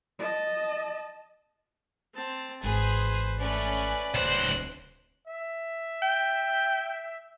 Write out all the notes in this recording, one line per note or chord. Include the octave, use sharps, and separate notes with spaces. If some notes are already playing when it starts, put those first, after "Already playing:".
D#5 A5
C4 A5
G#1 E3 G#4 B4 C5
A3 C#4 B4 D5
D1 C#2 C4 C5 F#6
E5
G5